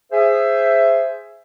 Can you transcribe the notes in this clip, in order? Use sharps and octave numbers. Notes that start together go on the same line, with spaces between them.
G#4 C5 E5